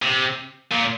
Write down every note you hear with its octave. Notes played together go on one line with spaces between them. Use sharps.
C3
A#2